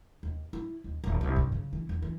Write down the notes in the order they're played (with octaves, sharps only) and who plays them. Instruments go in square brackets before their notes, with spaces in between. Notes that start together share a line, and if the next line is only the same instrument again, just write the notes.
[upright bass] D#2
E4
D#2
D#1
C2
G2
C#3
E3
E2
E3